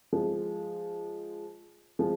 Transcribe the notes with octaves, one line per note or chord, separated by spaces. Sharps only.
F3 G#3
F3 G#3